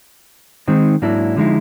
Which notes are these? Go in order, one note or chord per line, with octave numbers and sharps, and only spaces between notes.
D#3 G#3 C4 D#4
G#2 F#3 A#3 D4 E4
D3 F3 G#3 D#4 E4